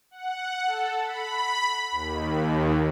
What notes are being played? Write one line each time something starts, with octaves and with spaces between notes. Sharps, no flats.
F#5
A4
B5
D#2